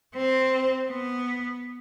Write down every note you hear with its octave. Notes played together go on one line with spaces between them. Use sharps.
C4
B3